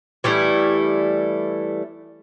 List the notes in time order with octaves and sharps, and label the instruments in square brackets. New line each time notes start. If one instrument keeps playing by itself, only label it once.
[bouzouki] E3 G3 A3 E4